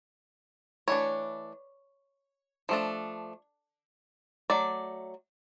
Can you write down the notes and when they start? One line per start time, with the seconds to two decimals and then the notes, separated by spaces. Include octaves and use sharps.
0.88 E3 A3 D4 C#5
2.69 F3 A3 D4
4.50 F#3 A3 D5